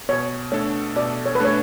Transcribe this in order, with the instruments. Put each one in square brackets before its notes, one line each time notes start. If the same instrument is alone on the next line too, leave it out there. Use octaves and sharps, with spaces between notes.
[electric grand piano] B2 [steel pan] C#5
[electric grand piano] A3 D4 A4 [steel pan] C#5
[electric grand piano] B2 [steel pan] D5
[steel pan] C#5
B4
[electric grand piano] A3 D4 A4 [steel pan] C#5